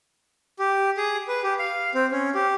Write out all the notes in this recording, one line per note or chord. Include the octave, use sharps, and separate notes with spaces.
G4
G#4
B4
G4
F5
C4
C#4
G4